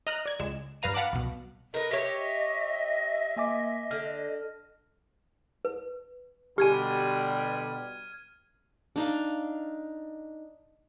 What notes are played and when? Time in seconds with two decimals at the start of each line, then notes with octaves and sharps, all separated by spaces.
0.07 D#5 A#5 F6 F#6
0.26 D5 G#6
0.39 C#2 G#3 E7
0.82 G2 B4 F5 A#5 D#7
0.94 F5 F#5 A5 B5 D6
1.13 C2 B2
1.74 A#4 B4 D#5
1.91 G4 C#5 E5
3.36 A#3 D#5 G#5 D6
3.91 D3 F6
5.65 B4
6.58 B2 D3 G3 G4 G#5 F6 G#6 D#7
8.96 D4 D#4 F5